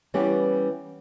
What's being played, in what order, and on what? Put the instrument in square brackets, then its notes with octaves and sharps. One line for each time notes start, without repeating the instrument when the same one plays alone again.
[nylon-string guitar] E3 G3 B3 C#4 G4